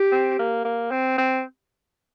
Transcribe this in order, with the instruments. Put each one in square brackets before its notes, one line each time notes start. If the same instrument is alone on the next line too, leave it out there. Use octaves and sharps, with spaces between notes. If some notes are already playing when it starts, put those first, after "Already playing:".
Already playing: [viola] G4
[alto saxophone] C4
A#3
A#3
C4
C4